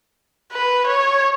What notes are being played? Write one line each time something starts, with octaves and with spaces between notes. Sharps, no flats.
B4
C#5